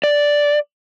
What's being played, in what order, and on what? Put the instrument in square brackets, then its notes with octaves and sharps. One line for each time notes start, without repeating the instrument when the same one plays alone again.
[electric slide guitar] D5